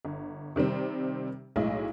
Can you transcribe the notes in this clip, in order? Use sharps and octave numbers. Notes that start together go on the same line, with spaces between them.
G1
C3 D#3 G3 C4
B1 A2 G#3 E4 D#5